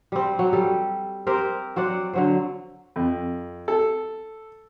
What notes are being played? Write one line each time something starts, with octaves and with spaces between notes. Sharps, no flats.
G3 C4
F#3
G3 G4 A4
C4 G4 A#4 C5
F#3 C5 D5 F#5
D3 F#3 C5
F2
A4